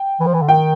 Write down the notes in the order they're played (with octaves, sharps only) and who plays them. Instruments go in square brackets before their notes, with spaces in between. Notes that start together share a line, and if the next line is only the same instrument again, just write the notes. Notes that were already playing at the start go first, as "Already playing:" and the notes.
Already playing: [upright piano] G5
[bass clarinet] E3
F3
E3
D3
[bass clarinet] D#3 [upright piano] G5